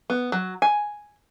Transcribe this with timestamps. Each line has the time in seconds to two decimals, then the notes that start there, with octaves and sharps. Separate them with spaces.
0.10 B3
0.32 F#3
0.62 G#5